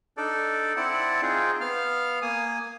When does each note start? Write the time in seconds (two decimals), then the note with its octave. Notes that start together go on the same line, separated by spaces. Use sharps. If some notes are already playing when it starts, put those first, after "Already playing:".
0.17 D4 D#4 A4 D5
0.77 C4 E4 D5 F#5 A5
1.22 C4 D#4 F4 G#4
1.61 B3 F5 F6
2.22 A#3 G#5 D#6